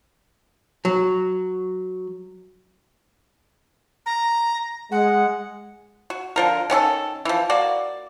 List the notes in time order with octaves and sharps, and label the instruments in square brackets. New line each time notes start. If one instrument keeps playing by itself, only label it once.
[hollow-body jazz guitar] F#3
[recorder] A#5
[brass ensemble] G#3 [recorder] F#5
[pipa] F#4
D3 F3 A#4
D#3 C#4 F#4 A4
E3 F3
A#3 F#4 D5